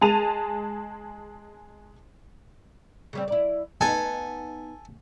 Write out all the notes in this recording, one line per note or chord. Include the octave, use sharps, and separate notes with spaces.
G#3 G#4 A5 D#7 F7
C#3 G3 C4
E4 D5
B3 D#4 A4 G#5